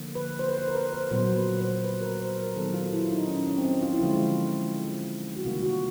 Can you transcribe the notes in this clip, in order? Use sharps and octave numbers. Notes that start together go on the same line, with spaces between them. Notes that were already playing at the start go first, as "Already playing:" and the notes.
Already playing: D3 F3 A#3
B4
C5
B4
C5
A#4
B4
C5
A#2 F#3 B3 C5
B4
C5
B4
A#4
C5
A#4
D#3 F#3 B3 A4
F4
E4
D#4
C#4
C#4
C4
C#4
F4
E4
D3 F3 G#3 F4
F#4
C3 D#3 G3 A#3 F4
F#4